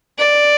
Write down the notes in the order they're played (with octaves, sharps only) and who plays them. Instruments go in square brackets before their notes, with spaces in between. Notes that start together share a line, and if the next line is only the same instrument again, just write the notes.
[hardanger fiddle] D5